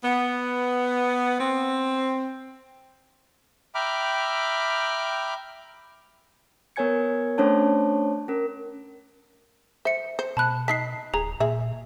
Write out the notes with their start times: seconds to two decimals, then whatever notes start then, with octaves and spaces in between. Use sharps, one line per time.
0.04 B3
1.40 C4
3.75 E5 G5 A#5 B5 D6 F6
6.76 B3 A#4 C#5 G#5 G#6 C#7
7.38 A3 C#4 D4 C5 C#5 A5
8.28 C#4 A#4
9.85 C5 E5 C#7
10.19 C5
10.37 B2 A5 B5 F#6
10.68 D#4 A5 B6 C7
11.14 D1 G#4 A#5
11.40 A#2 G#4 E5